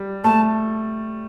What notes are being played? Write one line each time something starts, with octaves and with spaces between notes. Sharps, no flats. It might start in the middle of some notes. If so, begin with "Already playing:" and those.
Already playing: G3
A3 A5